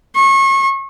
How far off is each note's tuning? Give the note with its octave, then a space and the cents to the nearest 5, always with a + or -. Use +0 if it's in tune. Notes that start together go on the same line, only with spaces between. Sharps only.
C#6 -30